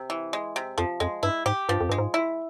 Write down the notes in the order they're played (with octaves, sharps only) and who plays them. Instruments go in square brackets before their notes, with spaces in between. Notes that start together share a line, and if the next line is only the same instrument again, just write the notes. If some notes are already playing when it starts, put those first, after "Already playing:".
Already playing: [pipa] C3
E3
G#3
C3
[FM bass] F2 [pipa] F3
[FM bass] F2 [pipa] G#3
[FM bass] G2 [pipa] E4
[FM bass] G#2 [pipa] G4
[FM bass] G2 [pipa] F3
[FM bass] F2
[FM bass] G2 [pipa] G#3
[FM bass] G#2
[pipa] E4